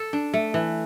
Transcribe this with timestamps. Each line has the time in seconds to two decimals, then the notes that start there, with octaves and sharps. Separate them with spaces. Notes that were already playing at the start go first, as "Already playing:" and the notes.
Already playing: A4
0.13 D4
0.34 A3
0.54 E3